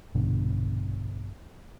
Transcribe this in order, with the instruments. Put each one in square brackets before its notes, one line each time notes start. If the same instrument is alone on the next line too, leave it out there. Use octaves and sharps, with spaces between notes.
[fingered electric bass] A#1 G2 B2 D3